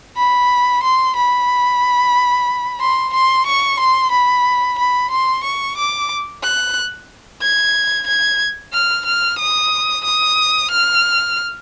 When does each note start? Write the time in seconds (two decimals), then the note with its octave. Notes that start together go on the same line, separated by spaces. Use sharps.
0.17 B5
0.83 C6
1.16 B5
2.80 C6
3.13 C6
3.47 C#6
3.80 C6
4.12 B5
4.79 B5
5.11 C6
5.44 C#6
5.77 D6
6.43 F#6
7.41 G#6
8.07 G#6
8.73 F6
9.05 F6
9.39 D#6
10.04 D#6
10.71 F6